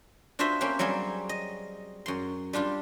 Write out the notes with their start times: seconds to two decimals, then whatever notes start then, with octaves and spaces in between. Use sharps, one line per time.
0.39 D4 F4 F#4 B4 C5 E5
0.61 A#3 C4 C#4 G4 C5
0.79 F#3 G3 A#3 C4 G#4
1.29 D#5
2.06 F#2 C6
2.53 G3 D4 F4 G4